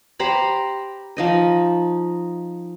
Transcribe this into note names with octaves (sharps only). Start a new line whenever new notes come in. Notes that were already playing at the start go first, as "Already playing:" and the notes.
G4 C5 A#5 B5
F3 D#4 D#5